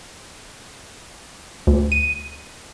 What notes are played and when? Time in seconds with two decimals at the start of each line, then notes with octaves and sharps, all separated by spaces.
1.67 D2
1.92 D#7